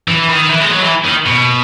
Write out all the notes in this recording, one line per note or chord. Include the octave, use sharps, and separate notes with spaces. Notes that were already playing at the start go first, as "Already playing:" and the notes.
E3
D#3
E3
G#3
F#3
E3
D#3
B2